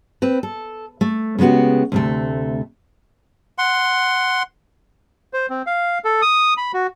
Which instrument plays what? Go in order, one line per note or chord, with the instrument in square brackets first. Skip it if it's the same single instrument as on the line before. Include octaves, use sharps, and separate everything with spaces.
[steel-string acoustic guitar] C4 B4
A4
A3
C#3 G#3 B3 F#4 G4
D2 C3 A3
[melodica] F#5 C6
[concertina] C5
C4
F5
A4
D#6
B5
F#4